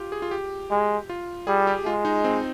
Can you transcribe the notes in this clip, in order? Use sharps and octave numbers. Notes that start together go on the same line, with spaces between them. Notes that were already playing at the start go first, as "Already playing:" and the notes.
Already playing: F4 G4
G#4
F4
G4
G#3
F4
G3 G#4
G4
G#3 F4
D#4
C4